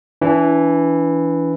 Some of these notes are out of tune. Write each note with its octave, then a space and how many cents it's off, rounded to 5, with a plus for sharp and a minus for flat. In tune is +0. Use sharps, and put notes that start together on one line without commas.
E3 +0 D4 -45